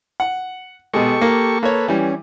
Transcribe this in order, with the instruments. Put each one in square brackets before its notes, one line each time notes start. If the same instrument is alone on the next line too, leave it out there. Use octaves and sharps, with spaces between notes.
[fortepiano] F#5
[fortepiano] B2 G#3 [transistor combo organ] G4 A4 C#6
[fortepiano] A#3
[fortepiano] A#3 C#5 [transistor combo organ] A4 B4
[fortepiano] E3 G3 [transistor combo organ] C#4